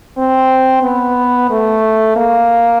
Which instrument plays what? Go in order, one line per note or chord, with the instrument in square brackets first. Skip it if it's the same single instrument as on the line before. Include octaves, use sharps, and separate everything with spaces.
[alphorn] C4
B3
A3
A#3